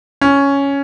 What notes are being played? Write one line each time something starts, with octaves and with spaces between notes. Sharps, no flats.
C#4